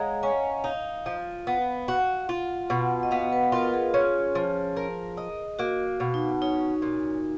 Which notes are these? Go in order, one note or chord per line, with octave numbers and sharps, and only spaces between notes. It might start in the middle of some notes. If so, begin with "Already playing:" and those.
Already playing: G#3 C#5 D#5 F5 F#5 A#5
C#4 G#5
D#4 F5
F3
B3
F#4
F4 F#5
B2 F#5
D#5
B3 F5
B4
F4 A#4
G#4
C#4 G#4
F3
A#4
D#5
A#3 F#4
B2
D#4
C#4 D#4
A#2